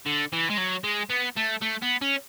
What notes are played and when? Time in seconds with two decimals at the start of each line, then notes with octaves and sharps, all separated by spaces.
0.06 D3
0.33 E3
0.50 G#3
0.58 F#3
0.84 G#3
1.10 B3
1.36 A3
1.61 A3
1.82 B3
2.01 C#4